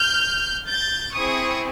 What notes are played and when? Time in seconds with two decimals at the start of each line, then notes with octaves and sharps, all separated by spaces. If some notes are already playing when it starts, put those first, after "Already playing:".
Already playing: F6 G6
0.67 G6 A6
1.14 C4 E4 G#4 C#6 D#6